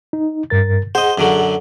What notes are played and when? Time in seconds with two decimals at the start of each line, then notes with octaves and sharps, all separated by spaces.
0.13 D#4
0.50 G2 A#4 A6
0.95 G#4 C5 D#5 F#5
1.18 F#2 D3 F#3